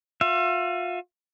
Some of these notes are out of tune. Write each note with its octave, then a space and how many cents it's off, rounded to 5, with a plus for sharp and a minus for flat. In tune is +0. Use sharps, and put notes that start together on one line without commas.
F4 +35 E5 +35